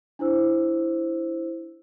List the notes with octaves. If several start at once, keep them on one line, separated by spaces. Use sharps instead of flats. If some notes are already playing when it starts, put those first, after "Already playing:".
D4 E4 C5 E6